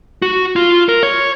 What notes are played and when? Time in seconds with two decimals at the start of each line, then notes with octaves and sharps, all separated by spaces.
0.22 F#4
0.56 F4
0.89 A#4
1.03 C#5